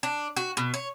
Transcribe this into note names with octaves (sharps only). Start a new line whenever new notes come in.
D4
F#4
B2
C#5